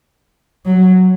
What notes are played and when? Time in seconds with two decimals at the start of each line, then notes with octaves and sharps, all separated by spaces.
0.66 F#3